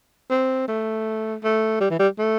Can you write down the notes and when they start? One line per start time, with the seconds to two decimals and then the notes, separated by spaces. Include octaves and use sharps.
0.30 C4
0.68 A3
1.44 A3
1.81 G3
1.90 E3
1.99 G3
2.19 A3